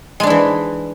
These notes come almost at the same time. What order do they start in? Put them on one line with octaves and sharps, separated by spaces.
G#3 D4 E4 E3